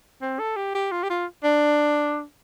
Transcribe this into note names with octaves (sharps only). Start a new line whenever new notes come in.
C4
A4
G4
G4
F4
G4
F4
D4